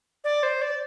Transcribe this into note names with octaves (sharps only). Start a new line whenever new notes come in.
D5
C5
D5